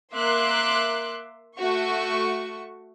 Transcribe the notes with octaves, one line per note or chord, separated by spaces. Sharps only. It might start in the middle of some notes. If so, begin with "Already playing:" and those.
A#3 E5 C6 D6 F#6
A3 F#4 C#6